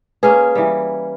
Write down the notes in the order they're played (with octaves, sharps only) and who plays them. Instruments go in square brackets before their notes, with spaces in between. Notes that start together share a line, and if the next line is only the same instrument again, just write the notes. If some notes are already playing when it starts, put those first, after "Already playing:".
[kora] A#3 C#4 G#4 [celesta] B4
[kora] E3 G3